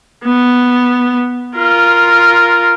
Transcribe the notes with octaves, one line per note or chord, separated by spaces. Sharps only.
B3
F4 A#4